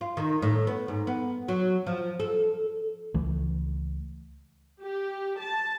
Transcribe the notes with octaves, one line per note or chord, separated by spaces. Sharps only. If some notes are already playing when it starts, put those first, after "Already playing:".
F4
D#3
A2
B3
G#2
B3
F#3
F3
A4
C#2 E3 A3
G4
A5